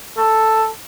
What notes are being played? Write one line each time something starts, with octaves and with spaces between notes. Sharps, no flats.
A4